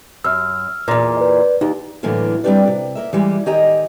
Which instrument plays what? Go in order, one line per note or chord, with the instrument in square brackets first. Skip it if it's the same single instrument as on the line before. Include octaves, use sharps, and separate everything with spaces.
[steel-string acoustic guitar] F#2 [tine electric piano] E6 F6
[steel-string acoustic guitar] E2 A#2
[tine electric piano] B4 D5
[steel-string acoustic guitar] D#2 [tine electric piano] D#4 G4
[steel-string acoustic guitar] A2 D3 E3 F#3 A#3 B3
G3 C4 D4 G4 B4 D5
C3
A#3 A#4 E5
E3 G3 G#3
D#3 G4 D#5 G#5 A#5